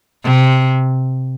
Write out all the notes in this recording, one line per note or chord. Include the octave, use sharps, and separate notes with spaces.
C3